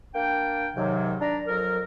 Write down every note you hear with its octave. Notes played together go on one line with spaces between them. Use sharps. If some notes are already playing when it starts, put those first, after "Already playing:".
A#3 D4 G5
G#2 C3 D#3 F#3
D4 A#5
F2 F#3 A#4